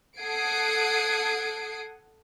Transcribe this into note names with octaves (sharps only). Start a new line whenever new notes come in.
A4 F#5 D#6 G#6 C7 D7